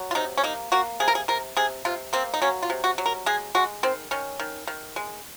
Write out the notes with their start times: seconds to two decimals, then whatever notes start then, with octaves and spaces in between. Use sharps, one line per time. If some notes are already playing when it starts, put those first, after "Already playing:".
Already playing: F#3
0.11 F4
0.15 C3 D#4
0.38 C#4
0.44 A#3 D#4
0.72 A#3 F#4
1.00 C3 G#4
1.08 A#4
1.15 G#4
1.28 C3 A#4
1.57 C3 G#4
1.85 C3 F4
2.13 A#3 C4
2.34 D#4
2.42 F#3 C#4
2.63 F4
2.70 C3
2.84 F#4
2.98 F#3
3.06 A#4
3.26 G#3 G#4
3.55 G#3 F#4
3.83 D#3 C4
4.11 D#3 C#4
4.40 D#3
4.67 D#3
4.96 G#3